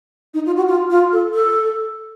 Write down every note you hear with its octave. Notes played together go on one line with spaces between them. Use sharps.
D#4
F4
F#4
F4
F4
A4
A4